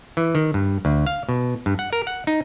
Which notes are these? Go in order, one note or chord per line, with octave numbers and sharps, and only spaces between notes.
E3
D#3
G2
D2
F5
B2
G2
F#5
A#4
F#5
D#4